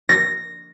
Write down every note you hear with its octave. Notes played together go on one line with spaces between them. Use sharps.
A#6